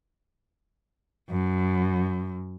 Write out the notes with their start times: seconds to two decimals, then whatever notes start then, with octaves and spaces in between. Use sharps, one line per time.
1.30 F#2